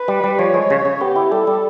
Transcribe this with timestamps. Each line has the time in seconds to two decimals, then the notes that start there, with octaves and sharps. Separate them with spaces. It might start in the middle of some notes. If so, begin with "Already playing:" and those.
Already playing: B4
0.08 G3
0.24 G3
0.39 F3 C#5
0.54 G#3
0.70 C#3
0.85 C#3
1.01 B3 G4
1.16 E4
1.31 G3 A4
1.47 G3